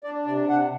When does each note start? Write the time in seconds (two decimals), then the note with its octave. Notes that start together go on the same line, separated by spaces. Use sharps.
0.04 D4 D5
0.26 C3 D5
0.49 C3 F#5